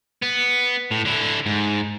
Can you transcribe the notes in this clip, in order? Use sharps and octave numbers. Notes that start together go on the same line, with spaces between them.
B3
A2
D3 E4
G#2